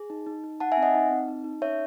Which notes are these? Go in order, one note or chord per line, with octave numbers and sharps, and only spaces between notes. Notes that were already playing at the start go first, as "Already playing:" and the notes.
Already playing: G#4
D#4
D#4
D#4
D#4 F#5 A5
E5 G#5
C4
D#5 F#5
D#4
C4
D#4
D#4
C#4 C#5 E5